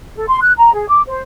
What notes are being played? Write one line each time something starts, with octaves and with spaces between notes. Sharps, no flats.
A4
C6
F#6
A#5
G#4
D6
C5